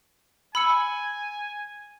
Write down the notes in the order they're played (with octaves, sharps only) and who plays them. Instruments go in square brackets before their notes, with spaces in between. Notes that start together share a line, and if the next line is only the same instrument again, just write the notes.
[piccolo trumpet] G#5 [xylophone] B5 E6 C#7